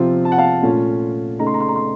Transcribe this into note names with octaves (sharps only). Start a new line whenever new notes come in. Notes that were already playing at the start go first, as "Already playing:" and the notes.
Already playing: C3 F3 C4 F4
A5
F#5
F5 A5
A#2 A3 C#4 F4
C#3 A3 D#4 A#5
C6
A#5
C6
A#5
C6